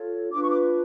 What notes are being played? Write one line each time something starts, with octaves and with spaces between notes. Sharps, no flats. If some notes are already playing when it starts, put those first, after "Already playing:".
Already playing: F4 A4 C#5
D4 F4 B4 D6
C#6
D6